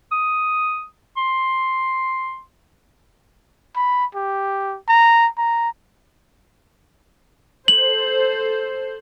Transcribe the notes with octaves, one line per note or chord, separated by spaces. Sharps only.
D#6
C6
B5
G4
A#5
A#5
A4 C5 F#7